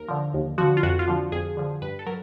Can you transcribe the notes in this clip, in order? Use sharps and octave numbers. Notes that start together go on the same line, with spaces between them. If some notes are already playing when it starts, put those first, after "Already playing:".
Already playing: D#2 A#4
D3 F3
D#2
D3 F3 F#4
F4
F2 F#4
F4
D3 F3
F2 G#4
D3 F3
G2 B4
A4
F#3 A#4